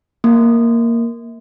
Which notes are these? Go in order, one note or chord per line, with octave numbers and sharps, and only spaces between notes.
A#3